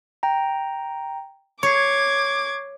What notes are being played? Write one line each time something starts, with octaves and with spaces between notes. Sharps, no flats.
G5 A#5
C#5 C#6 D6 G#6 C7